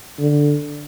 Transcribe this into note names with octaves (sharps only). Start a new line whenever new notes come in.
D3